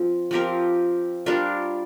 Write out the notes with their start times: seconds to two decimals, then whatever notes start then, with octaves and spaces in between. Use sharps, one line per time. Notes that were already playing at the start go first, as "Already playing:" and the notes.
Already playing: F3 C4
0.31 F3 C4 G4 A#4
1.26 G3 D4 F4 A#4